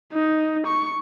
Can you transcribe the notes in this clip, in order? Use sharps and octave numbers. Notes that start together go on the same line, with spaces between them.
D#4
C#6